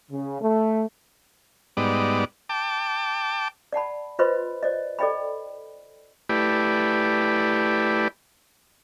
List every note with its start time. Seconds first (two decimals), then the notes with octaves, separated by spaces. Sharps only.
0.11 C#3
0.42 A3
1.77 G#2 G3 B3 D#4 D5
2.49 G5 A5 D6
3.73 D5 F#5 A5 B5
4.19 F4 B4 C5 D#5 B5 C6
4.63 C5 D5 D#5
4.99 A4 D5 D#5 G5 B5
6.29 A3 E4 G4 B4 D5